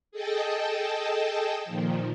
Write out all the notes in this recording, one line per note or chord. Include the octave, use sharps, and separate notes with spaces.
G#4 A4 D#5 G5 A5
A#2 D#3 F3